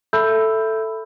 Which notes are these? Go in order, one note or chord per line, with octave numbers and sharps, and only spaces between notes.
A4 E5 A5 B5 E6 G6